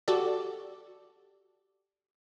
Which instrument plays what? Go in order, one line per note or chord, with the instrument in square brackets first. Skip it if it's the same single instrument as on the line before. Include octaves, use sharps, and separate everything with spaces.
[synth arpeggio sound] F#4 G4 A4 D5